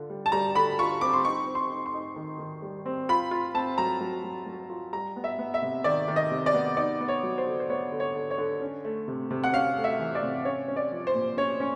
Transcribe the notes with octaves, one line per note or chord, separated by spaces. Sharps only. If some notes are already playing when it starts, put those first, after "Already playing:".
Already playing: D3 F4
G3
A5
G3 A#5
D3 B5
F4 C#6
C4 D6
C6
D#4 C#6
C4
C6
D#4
C6
D#4
D#3
D#3
G3
C4
F4 B5
F4
C4 A5
F#3 A#5
F#3
F#3
F#3
F4
G3 A#5
B3
E5
B3
E5
C3
D#3 D5
D#3
D#5
C3
D5
B3
D#4 D5
B3
C#5
F#3
C5
D3
C5
B3 C#5
D3
C#5
D3
C#5
D3
C#4
A3
C3
C3
F#5
C#4 F5
A3
E5
E3
D5
C3
C#4 C#5
C#4
D5
F3
C5
A#2
C#4 C#5
C#4